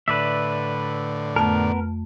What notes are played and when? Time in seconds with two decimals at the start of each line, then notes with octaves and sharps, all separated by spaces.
0.08 A2 D3 B4 D5 E5
1.36 F2 A3 B3 A#4 A5